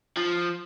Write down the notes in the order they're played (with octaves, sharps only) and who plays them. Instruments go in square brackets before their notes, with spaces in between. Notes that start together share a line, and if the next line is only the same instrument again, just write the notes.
[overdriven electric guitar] F3